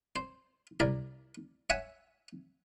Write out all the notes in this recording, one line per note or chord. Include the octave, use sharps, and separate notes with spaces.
C5
C2 A#4 D5
C#5 E5 F#5 G#5